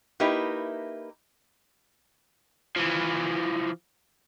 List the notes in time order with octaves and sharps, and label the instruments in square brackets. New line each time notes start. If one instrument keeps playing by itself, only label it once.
[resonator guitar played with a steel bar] A#3 D#4 E4 G4 B4
[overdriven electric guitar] E3 F3